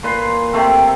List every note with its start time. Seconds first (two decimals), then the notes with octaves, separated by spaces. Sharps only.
0.03 A#2 B4 C6
0.53 C3 A3 C4